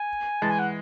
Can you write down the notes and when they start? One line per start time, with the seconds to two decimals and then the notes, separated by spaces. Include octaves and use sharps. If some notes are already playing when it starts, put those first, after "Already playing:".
Already playing: G#5
0.42 E3 G#3 A5
0.50 G#5
0.59 F#5